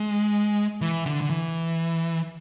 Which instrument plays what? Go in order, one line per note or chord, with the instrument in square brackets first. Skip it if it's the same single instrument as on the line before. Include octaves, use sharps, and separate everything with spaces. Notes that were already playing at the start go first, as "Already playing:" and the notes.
Already playing: [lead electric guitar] G#3
E3
D3
D3
E3